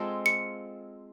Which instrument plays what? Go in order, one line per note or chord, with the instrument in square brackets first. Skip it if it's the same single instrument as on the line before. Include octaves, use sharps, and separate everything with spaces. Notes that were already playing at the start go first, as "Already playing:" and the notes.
Already playing: [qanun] G#3 C4 F4 A4
[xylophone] C#7